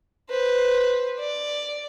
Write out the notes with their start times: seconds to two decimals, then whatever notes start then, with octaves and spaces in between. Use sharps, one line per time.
0.30 B4 C5
1.20 D5